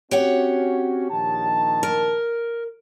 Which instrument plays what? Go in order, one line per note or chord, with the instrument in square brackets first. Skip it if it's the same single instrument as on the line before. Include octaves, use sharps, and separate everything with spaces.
[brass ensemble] C4 C#4 F#4 [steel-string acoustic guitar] G4 C#5 F#5
[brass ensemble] A#1 D#3 A5
[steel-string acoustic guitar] A#4